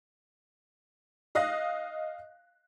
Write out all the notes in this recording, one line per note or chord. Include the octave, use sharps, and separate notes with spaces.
D#5 F5 D#6 F#6 A#6